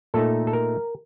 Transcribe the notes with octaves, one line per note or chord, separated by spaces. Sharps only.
A#2 A3 D#4 A4
A4
A#4